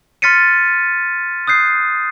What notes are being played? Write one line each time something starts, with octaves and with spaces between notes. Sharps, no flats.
C6 F6 A6 B6 C#7 D#7
D#6 F#6 G6 C7